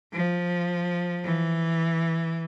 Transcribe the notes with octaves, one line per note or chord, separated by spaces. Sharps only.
F3
E3